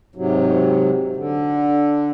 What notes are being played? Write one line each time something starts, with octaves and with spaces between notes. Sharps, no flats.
G#2 C3 F#3
D3